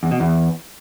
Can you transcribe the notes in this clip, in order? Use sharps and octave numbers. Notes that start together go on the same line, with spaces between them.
E2
B2
E2